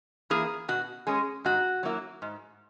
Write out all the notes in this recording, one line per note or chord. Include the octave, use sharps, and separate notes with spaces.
E3 A#3 E4 G#4
B2 F#4
G#3 C#4 G#4
G#2 F#4
F#3 A#3 E4
G#2